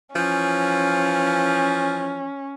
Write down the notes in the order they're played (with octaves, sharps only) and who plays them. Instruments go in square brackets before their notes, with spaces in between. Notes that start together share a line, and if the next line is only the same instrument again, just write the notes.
[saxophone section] E3 F3 [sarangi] C#4